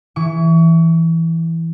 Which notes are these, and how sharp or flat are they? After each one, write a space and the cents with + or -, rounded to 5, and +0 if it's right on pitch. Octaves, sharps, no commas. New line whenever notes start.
E3 +0 C#6 +35